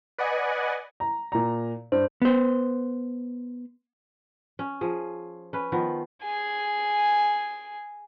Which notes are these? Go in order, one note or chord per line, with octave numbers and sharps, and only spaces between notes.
B4 D5 D#5 F#5 G#5
A#5
A#2 A#5
G2 C5
B3 C5
C#4
F3 G#4
C#4 B4
D#3 F3 B3
G#4 G#5